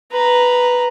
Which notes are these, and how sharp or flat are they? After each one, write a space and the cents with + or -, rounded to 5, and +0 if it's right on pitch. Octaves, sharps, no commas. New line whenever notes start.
B4 +0 A#5 +0